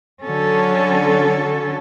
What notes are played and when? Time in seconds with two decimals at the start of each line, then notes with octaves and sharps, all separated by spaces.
0.22 D3 F#3 C#4 A4